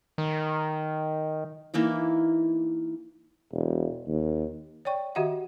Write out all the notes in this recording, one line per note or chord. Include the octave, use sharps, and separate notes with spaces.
D#3
E3 A#3 D#4 E4
E1
D#2
C#5 D5 G5 C#6
D#3 F#4 G4 D#5 E5 F#5